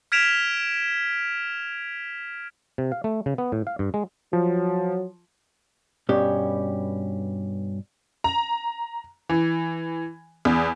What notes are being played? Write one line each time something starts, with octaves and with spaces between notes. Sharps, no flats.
F6 G#6 B6 D7 E7 F7
C3
F5
A3
C#3
B3
A2
F5
G2
G#3
F3 F#3
G2 B2 C#4 G4
A#5
E3
E2